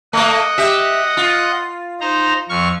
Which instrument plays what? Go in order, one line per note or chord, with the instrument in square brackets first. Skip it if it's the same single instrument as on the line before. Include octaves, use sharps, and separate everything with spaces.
[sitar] A3 A#3 [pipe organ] D#5 F#5
[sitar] G4 E5
F4
[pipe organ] D#4 C5 A#5
F2 C#6 F6